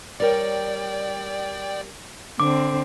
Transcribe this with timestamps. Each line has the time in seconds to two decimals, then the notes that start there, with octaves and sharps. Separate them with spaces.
0.20 G3 A#4 C#5 D5 G5
2.40 D3 C4 D6